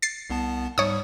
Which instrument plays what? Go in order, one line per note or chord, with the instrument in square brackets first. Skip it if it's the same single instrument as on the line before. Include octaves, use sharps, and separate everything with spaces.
[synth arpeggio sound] A6 C7
[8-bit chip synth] C2 B3 A5
[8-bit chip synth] G#2 G3 [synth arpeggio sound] C#5 D#6